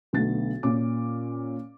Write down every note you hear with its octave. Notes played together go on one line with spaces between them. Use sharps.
B1 D3 A3 B3 A6
A#2 C#4 D6